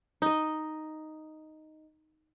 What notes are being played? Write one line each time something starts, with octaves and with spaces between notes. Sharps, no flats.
D#4 D#5